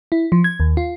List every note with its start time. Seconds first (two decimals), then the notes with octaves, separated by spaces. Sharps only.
0.12 E4
0.32 F3
0.44 G#6
0.60 D#2
0.77 F4